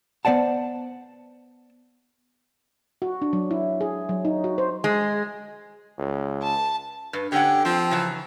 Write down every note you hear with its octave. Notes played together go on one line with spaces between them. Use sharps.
B3 C5 D5 F#5 A5
F#4
D4
F#3
E4
G#4
F#3
D#4
F#4
C5
G#3
C#2
A5
G2 B4
D3 C#4 G4 F#5 G5
F3 C4
C#3 E3 F#3